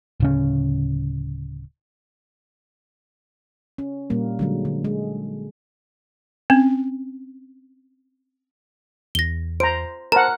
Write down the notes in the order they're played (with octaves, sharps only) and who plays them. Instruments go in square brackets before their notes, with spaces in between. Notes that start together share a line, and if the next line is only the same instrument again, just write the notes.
[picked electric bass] D1 C#3 C#4
[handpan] C#4
A#2 G3 A#3
D3 F#3 G#3
D3
G#3
[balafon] C4 C#4
[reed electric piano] E2 [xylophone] A#6 G7
[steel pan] C5 A#5 [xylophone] D7
[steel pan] A#4 F#5 [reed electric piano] C5 A5 [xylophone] A#5